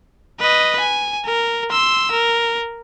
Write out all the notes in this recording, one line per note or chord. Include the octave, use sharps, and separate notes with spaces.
B4 D#5
G#5
A#4
C6 E6
A#4